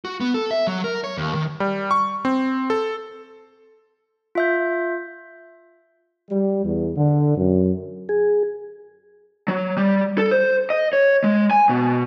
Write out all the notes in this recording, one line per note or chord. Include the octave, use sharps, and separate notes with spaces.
F#4
B3
A4
E5
F#3
A#4
C#5
D#2
D#3
G3
C#6
C4
A4
F4 E5 G6
G3
E2
D3
F#2
G#4
F#3
G3
A4
C5
D#5
C#5
G#3
G#5
B2